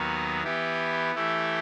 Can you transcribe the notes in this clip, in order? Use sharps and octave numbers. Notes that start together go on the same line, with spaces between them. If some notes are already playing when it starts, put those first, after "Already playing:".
Already playing: D#2 D#3 F#3 B3 D#4
E3 B3 E4 G4
E3 A3 E4 G4